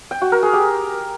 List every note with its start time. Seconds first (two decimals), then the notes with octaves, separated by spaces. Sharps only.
0.11 G5
0.22 F#4
0.32 A#4
0.43 G#4
0.53 G4